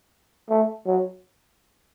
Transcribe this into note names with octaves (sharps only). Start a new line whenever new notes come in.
A3
F#3